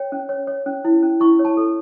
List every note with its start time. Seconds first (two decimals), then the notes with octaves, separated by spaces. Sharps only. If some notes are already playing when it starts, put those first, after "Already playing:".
Already playing: C#5 G5
0.12 C#4
0.29 C#5
0.47 C#5
0.66 C#4
0.85 E4
1.03 C#4
1.20 E4 C#6
1.39 C#5
1.45 A5
1.57 A4